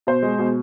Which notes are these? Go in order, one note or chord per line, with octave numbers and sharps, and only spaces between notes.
B2 C5
G#3
B2